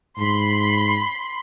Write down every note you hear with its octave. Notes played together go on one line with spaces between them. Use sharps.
G#2 B5 C6